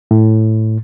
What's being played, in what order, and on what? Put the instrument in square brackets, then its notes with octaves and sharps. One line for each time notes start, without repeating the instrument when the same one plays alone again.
[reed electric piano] A2